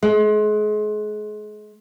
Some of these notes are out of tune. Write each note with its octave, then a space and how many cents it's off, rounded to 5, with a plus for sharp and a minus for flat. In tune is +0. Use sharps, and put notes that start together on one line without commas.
G#3 +30